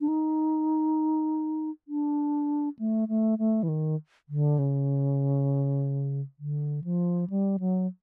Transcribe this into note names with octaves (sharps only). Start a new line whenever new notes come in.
D4
D#4
D4
A3
A3
A3
E3
D#3
D3
C#3
D3
F3
G3
F#3